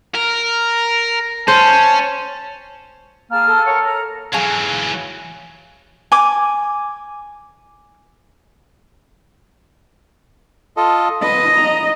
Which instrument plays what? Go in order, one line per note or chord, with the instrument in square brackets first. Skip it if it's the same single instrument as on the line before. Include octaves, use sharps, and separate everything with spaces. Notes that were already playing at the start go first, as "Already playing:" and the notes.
[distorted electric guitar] A#4
[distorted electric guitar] C#4 [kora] C5 [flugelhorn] A5
[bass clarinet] A#3 [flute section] G#4 A5 F6
[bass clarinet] A4
[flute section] A#4 C#5 F#5
A#4 A#5
[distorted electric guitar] E3 F#3 [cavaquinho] G#4 F5
[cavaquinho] G#5 D6
[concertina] F4 A4 D#5
[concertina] B4 [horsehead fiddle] D#5
[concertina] A#5